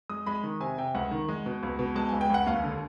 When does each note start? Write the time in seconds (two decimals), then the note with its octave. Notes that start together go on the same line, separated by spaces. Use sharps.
0.09 G#3 D#6
0.26 G#3 B5
0.43 D#3
0.60 C3 G#5
0.78 C3 G5
0.95 C#2 F#5
1.11 D#3
1.28 G#3
1.46 B2
1.63 C#2
1.79 B2
1.95 G#3 A5
2.09 C#2 G#5
2.21 G5
2.30 C#2 F#5
2.46 D#2 F5
2.64 D3